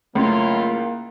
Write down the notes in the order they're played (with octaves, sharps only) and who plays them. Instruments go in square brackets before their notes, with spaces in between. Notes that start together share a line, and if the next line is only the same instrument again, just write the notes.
[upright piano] C#2 [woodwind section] F#3 E4 F4 [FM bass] A3 [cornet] A#3